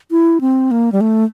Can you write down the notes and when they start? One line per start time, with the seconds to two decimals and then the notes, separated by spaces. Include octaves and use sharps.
0.11 E4
0.41 C4
0.71 A#3
0.92 G3
1.01 A3